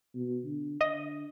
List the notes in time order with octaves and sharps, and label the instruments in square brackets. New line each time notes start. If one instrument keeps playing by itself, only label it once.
[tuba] B2
D3
[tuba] D3 [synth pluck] D#5